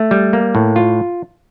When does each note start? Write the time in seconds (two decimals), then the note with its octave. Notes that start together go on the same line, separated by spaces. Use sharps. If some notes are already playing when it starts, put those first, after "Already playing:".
Already playing: A3
0.11 G3
0.33 A#3
0.55 A2
0.76 F4